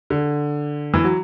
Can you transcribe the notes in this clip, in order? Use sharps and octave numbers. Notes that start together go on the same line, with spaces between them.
D3
E3
F#3